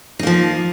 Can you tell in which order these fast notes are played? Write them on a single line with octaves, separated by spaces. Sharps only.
D#4 A#3 F3